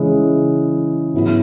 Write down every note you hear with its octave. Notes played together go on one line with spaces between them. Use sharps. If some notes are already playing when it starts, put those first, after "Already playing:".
Already playing: C#3 E3 G#3 C#4 E4
G#2 F#3 B3 E4